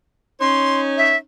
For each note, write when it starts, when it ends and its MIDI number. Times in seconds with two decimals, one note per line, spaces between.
0.41 1.17 61
0.41 1.17 63
0.41 1.17 73
0.41 0.81 84
0.97 1.16 76